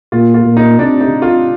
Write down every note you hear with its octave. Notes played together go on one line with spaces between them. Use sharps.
A#2 F4
F4
A#2
D#4
C3 D4
D#4
C3
F4